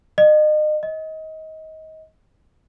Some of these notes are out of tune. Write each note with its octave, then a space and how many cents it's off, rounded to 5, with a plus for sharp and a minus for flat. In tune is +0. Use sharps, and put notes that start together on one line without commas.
D#5 -35
D#5 +25